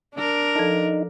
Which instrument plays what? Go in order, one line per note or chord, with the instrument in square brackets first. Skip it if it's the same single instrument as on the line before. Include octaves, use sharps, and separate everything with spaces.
[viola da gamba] D4 A#4
[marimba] F3 A4 A5 [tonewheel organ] D#4